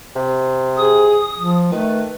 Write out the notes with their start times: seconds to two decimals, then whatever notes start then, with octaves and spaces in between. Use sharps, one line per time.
0.16 C3
0.77 G#4 D#6
1.38 F3
1.72 D#3 A3 B4